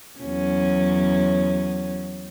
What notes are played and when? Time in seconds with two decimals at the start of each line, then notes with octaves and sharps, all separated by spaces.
0.20 E2 F#3 C#4